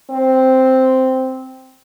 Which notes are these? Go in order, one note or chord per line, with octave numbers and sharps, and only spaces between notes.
C4